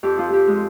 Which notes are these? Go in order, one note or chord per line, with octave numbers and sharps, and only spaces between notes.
F2 G4
F3 F4
F3 G4
G#3